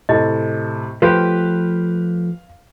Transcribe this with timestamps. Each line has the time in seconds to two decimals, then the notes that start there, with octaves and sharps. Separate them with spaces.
0.09 A2 C3 A4 D#5
1.02 F3 A3 G4 B4 F5